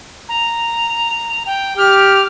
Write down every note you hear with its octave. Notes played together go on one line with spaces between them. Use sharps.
A#5
G5
G4 F6